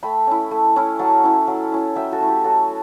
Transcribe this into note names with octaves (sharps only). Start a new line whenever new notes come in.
A3 G5 B5
C#4 E4
A3
C#4 E4
F#3 F#5 A5
C#4 E4
F#3
C#4 E4
F#3 E5 G5
F#4 A4
A3 E4
G4
F#3 F#4 A4